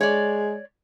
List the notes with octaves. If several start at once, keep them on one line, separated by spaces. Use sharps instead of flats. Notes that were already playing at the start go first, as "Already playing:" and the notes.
G#3 C#5 D5